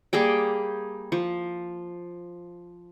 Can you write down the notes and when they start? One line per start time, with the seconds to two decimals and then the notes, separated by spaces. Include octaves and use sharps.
0.13 G3 A#3 G#4 G5
1.12 F3